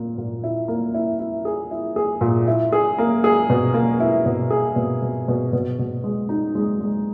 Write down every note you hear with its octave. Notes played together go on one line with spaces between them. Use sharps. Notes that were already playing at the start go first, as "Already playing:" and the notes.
Already playing: A#2 A#3
A#2
E4
A#3
E4
E4
G#4
E4
G#4
A#2
E4
G#4
A#3
G#4
B2
A#3
E4
B2
G#4
B2
B2
B2
B2
B2
G#3
D#4
G#3
G#3